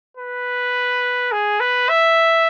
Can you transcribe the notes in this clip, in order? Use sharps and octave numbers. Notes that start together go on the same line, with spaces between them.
B4
G#4
B4
E5